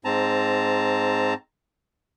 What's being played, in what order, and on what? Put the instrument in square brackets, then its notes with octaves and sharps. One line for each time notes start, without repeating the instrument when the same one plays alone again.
[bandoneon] G#2 C4 A5 A#5